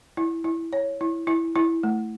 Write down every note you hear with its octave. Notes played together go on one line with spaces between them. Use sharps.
E4
E4
C#5
E4
E4
E4
A3